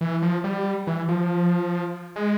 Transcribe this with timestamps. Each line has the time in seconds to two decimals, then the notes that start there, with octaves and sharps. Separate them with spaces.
0.01 E3
0.22 F3
0.44 G3
0.87 E3
1.09 F3
2.16 G#3